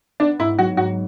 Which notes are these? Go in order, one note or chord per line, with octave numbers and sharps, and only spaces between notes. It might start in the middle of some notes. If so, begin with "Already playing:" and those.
B3 D4
G#2 E4
F#3 F#4
G#2 F#4